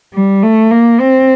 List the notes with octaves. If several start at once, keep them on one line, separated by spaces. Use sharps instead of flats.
G3
A3
A#3
C4